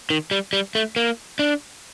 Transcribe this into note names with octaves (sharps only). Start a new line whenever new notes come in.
D#3
G3
G3
A3
A#3
D4